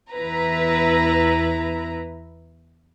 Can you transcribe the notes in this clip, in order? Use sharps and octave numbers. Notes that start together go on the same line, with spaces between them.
E2 E4 B4 A#5